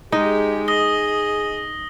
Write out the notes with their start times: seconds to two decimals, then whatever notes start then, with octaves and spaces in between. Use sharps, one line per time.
0.12 G#3 D#4 G4 G#4
0.68 D#5 D#6 A#6 G7